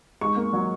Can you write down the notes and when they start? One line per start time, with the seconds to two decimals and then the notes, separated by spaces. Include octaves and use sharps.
0.21 G#2 C#6
0.36 A#3
0.53 F#3